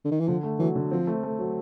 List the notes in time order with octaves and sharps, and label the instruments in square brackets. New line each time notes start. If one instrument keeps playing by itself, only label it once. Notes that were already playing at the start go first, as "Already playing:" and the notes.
[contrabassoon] D3
D#3
E3
[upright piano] D3 [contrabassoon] F3
[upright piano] A3
[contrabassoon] E3 [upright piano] F#3
[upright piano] D3
[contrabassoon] F3 [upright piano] C4
[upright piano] A3
A3
F#3